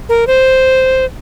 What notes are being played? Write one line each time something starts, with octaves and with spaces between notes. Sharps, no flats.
A#4
C5